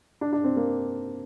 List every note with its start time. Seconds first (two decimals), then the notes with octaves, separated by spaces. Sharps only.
0.21 D4
0.33 D4
0.44 C4
0.57 A#3